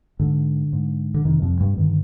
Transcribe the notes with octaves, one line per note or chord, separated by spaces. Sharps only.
G#2 D3
G#2
D3
F2 C3 D#3
F2 F3
G2 G3
G2 D3 D#3